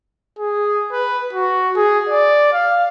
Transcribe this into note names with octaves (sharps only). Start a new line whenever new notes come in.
G#4
B4
F#4
G#4
D5
F5